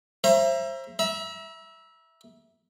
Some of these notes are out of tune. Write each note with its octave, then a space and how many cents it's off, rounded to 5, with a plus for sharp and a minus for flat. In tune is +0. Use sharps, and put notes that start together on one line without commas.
C5 +30 E5 +30 A#5 +30
E5 -5 A#5 +45